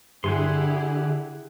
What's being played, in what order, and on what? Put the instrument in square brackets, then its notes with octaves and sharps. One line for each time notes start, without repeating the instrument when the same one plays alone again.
[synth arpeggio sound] G2 [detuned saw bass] D3 [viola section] E4 G4 G#4 [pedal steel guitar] F#5 G#5 C6